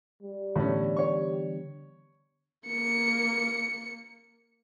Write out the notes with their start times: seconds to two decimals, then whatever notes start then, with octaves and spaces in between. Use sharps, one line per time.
0.23 G3
0.56 A2 D3 E3 B3 C#4
0.96 C#5 C#6
2.67 A#3 C#7